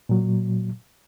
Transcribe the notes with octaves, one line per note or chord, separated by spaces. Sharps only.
A#2 F#3